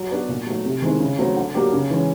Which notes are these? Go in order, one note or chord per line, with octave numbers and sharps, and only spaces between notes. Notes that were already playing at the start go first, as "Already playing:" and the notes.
Already playing: F#3
B3 D4 F#4
A#2
F#3 A3
C3
D#3 G#3 C4 E4
C#3
F#3 A3 C4
D3
F#3 A#3 D4 G4
C#3
E3 G#3 C#4